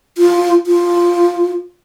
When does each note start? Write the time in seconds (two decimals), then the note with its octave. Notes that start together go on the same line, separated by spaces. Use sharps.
0.18 F4
0.67 F4